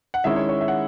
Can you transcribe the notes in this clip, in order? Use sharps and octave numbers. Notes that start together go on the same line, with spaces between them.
F#5
D#3 G#3 C#4 E4 E5
C#5
C#5
E5
F#5